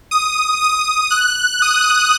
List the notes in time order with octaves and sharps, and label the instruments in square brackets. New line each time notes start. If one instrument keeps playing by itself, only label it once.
[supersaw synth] D#6
D#6
F#6
D#6